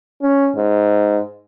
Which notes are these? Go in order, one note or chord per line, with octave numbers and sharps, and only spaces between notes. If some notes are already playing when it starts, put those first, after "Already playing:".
C#4
G#2